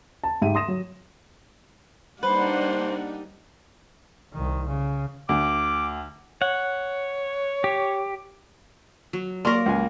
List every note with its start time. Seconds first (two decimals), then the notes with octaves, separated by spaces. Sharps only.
0.24 A5
0.42 G#2 G4 E5 D#7
0.55 C6 D#6 A#6 E7
0.68 F#3
2.23 G3 A#3 D4 D#4 B4 C5 F#5
4.33 C2 D#3
4.67 C#3
5.29 D2 D6
6.42 C#5 F#5
7.64 G4
9.13 F#3
9.45 A#3 A#4 D5 C6 C#6
9.66 C#2 F4 G#5